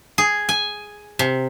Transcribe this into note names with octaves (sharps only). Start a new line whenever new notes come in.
G#4
G#5
C3